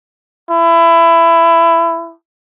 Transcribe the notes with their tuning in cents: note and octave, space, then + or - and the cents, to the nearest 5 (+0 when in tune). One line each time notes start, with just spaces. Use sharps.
E4 +20